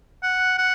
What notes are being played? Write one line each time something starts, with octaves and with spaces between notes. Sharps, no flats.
F#5
F#5